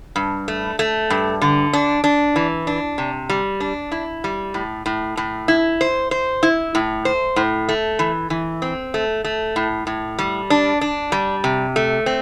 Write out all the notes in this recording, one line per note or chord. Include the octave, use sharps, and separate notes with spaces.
G2
A3
A3
G2
D3
D4
D4
E3
D4
C3
G3
D4
E4
G3
A2
A2
A2
E4
C5
C5
E4
A2
C5
A2
A3
E3
E3
C4
A3
A3
A2
A2
G3
D4
D4
G3
C3
A3
C4